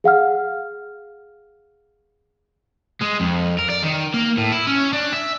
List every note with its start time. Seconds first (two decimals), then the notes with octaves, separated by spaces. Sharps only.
0.04 G#4 F5 F#5 F6
3.01 G#3
3.20 F2
3.59 A#4
3.70 D5
3.83 D#3
4.14 A#3
4.37 A2
4.52 E4
4.67 C#4
4.93 D4
5.12 E5